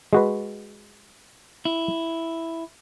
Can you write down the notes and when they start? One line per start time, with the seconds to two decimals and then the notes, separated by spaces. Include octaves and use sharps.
0.13 G#3 F#4 B4
1.65 E4